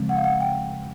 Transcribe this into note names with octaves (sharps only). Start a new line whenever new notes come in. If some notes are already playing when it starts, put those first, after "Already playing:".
Already playing: C#3 F3 G#3 C4
F#5
F5
F#5
G5